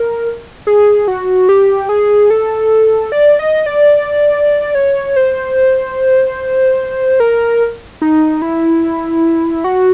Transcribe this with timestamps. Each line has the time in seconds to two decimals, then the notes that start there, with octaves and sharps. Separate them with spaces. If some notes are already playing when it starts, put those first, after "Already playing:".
Already playing: A#4
0.67 G#4
1.08 F#4
1.49 G4
1.89 G#4
2.30 A4
3.12 D5
3.39 D#5
3.66 D5
4.75 C#5
5.16 C5
7.20 A#4
8.02 D#4
8.42 E4
9.64 F#4